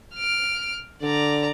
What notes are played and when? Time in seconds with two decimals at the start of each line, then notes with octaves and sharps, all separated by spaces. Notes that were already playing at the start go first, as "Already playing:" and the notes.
0.15 F6 D7
1.02 D3 D5 A#5